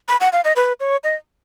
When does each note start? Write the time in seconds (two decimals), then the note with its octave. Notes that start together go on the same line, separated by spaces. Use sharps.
0.08 B5
0.20 F#5
0.33 F5
0.44 D#5
0.56 B4
0.80 C#5
1.04 D#5